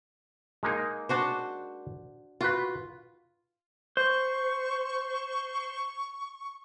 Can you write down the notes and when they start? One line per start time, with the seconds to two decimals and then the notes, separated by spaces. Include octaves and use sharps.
0.63 G#3 A#3 D#4
1.09 D4 F#4 C5
2.41 F4 F#4 B4
3.97 C5 C#6